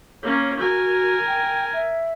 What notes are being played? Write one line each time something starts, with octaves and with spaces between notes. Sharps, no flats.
A#3 C#4 C#5
F#4 A#4 G#5
G5
E5